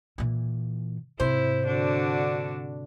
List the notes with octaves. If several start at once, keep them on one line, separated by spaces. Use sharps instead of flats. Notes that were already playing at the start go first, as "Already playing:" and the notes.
A#2 E3
G#2 C3 E4 C5
D3 D4 F#4